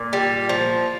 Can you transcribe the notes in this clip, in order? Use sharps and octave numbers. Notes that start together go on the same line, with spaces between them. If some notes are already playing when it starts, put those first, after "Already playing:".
Already playing: A#2
G3
F3